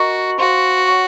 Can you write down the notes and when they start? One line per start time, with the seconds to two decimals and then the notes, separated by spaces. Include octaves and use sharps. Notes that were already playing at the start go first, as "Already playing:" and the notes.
Already playing: F#4 A#4 D#5 A#5 C#6
0.39 F#4 C5 F5 C6
0.88 C#5 F#5 C#6